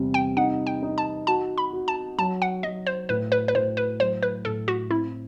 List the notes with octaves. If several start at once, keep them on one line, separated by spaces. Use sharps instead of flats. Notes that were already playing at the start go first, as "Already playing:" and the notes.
Already playing: E2 C3 G3
G5
D#4 F#5
G5
D#4
A5
F#4 A5
B5
F#4
A5
F#3 A5
F#5
F#3 D#5
C5
A2 B4
B4
B4
A2 C5
B4
F#3 C5
B4
A2 A4
F#4
C4 E4